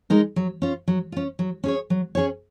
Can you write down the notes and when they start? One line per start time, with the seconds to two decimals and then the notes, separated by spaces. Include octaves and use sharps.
0.10 G#3 D#4 A#4
0.36 F#3
0.62 C#4 F4
0.88 F#3
1.12 C#4 F4
1.39 F#3
1.64 C#4 G#4 C#5
1.90 F#3
2.15 C#4 G#4 C#5